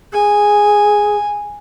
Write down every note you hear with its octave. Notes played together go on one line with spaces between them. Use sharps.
G#4 G#5